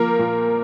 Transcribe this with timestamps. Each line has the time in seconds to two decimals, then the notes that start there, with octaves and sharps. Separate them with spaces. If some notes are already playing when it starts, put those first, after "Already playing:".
Already playing: F3 A#3 A#4
0.19 A#2